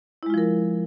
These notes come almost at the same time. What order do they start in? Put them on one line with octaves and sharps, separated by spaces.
E4 G#3 F4 F3 A#4